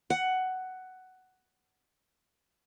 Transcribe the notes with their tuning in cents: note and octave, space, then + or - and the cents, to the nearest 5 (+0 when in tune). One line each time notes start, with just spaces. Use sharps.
F#5 +10